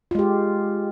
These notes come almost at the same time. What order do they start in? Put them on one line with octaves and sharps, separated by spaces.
F4 G#3 G4